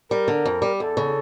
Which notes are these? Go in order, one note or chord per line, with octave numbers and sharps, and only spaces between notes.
G3 A#4
D3
F2
G3
E2 A4
C#3